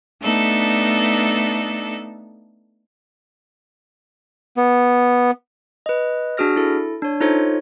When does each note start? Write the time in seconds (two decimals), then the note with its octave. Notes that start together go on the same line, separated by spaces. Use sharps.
0.21 A3 B3 D4 D#4 A4
4.57 B3
5.86 B4 D#5
6.37 D4 F#4 G#4 F6 A#6
6.56 E4 A4
7.02 D4 C#5
7.21 D#4 F4 A4 C5 C#5